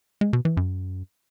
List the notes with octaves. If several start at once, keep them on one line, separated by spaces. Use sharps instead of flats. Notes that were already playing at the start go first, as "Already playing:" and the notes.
G#3
B2
E3
F#2